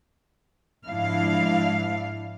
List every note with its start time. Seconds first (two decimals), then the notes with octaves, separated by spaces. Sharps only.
0.87 G#2 F3 D4 E4 F5